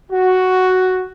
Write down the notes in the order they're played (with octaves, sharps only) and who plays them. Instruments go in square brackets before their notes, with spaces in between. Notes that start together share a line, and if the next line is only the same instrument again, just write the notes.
[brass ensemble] F#4